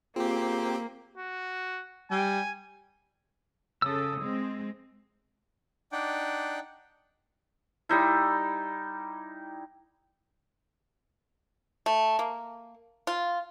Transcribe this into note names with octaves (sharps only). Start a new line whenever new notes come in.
A#3 C4 F4 G4 G#4
F#4
G3 G#5
C#3 A4 D#6 E6
G#3 C4
D4 D#4 D5 F#5 G5
G3 D#4 E4
A3
A#3
F4